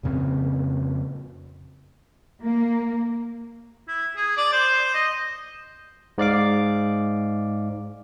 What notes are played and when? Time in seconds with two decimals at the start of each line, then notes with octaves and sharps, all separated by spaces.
0.03 F2 A#2 C#3 C4
2.43 A#3
3.88 E4
4.16 G#4
4.37 D5
4.52 C5
4.94 D#5
6.18 G#2 D5 F5 D6